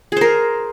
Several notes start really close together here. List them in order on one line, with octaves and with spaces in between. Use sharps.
G#4 C5 A#4